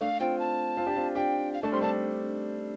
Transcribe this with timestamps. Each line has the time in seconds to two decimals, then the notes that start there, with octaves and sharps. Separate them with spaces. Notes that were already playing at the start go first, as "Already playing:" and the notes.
0.01 A3 D4 F5
0.20 C4 F4 G5
0.39 A5
0.77 C4 F4
0.86 D4 G4
0.96 C4 F4
1.15 D4 G4 G5
1.54 F5
1.63 A3 D4 A5
1.72 G3 C4 C6
1.82 A3 D4 A5